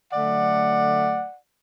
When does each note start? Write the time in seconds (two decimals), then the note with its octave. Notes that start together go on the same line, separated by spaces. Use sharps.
0.13 D3 F#3 A3 D5 F#5